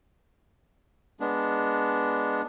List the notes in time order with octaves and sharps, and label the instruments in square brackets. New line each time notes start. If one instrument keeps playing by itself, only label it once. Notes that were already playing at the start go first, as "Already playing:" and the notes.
[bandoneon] G#3 B3 D4